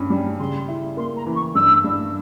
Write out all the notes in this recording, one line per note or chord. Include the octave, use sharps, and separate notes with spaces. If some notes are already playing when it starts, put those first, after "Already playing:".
Already playing: G2 C#4
G3
C#3 C6
E4
A#3 C6
A#5
E3
C#6
G2 E6
G2